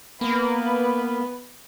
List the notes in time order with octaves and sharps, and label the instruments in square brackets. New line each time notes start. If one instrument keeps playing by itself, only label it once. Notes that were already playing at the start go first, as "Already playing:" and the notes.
[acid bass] A#3 [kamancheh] B3 B4